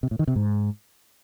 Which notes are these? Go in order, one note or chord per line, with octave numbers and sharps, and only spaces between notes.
C3
A2
D#3
C3
G#2